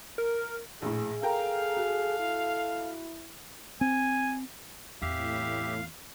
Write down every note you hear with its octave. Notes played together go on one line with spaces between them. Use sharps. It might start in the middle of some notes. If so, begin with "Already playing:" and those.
A#4
A#1 A2 G#4
A4 A#4 F5 G5 A#5
F#4
E4
C4 G#5
E2 A2 C4 G4 E5 F5